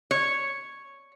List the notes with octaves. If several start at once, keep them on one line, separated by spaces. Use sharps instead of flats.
C#5